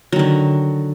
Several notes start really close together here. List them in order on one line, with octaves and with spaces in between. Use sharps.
F#3 D#3 D3